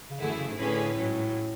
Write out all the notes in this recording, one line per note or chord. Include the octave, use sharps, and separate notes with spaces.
C#3
F#2 D3 E3 A3 E4 G#4
C#3
G#2
A2 D3 A3 C#4 G#4 B4
A1 G#2 F#3 C#4